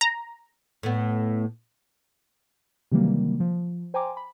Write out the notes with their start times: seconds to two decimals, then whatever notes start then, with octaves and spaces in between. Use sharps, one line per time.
0.01 A#5
0.83 A2 A3 B3
2.91 C3 D#3 E3 F#3 G3 A#3
3.40 F3
3.94 C5 G5 G#5 A#5 C6 D6
4.17 B5